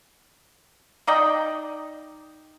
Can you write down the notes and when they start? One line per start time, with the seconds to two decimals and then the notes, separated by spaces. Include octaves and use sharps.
1.07 D#4 D5 D#5 G5